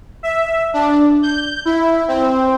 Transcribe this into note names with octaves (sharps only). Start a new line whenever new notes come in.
E5
D4
G6
E4
C4